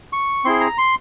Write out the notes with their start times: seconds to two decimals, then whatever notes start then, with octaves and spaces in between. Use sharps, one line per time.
0.13 C#6
0.45 C4 E4 G#4 C6
0.60 A#5
0.78 C6